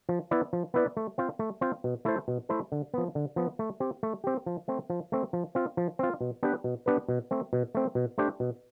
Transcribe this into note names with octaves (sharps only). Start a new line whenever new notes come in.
F3
B3 E4 B4 D5
F3
B3 E4 B4 D5
A3
C4 F4 C5
A3
C4 F4 C5
B2
A3 E4 A4 C5
B2
A3 E4 A4 C5
D3
F3 B3
D3
F3 B3
A3
C4 G4
A3
C4 G4
F3
A3 C4
F3
A3 C4
F3
C4 F4
F3
C4 F4
B2
B3 D4 G4 B4
B2
B3 D4 G4 B4
B2
A3 C4
B2
A3 C4
B2
A3 D4 G4 C5
B2